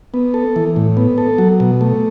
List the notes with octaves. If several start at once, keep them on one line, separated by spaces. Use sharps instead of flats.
B3
A4
E3
A2
B3
A4
F#3
B2
A3